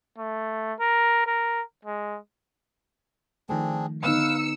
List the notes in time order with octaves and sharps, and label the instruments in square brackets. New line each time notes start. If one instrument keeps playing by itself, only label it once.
[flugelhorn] A3
A#4
A#4
G#3
[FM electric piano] D#3 F3 A3 [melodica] C4 D4 G#4
[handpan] D3 B3 D#4 [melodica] B4 F5 [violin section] E6 C#7